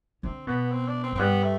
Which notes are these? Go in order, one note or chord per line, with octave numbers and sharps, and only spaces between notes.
D3 C4
B2 B3
C4
D4
C4
F#2
C4
G2 B3
A3